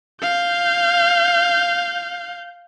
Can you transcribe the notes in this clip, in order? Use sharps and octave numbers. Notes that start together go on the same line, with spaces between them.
F5 G6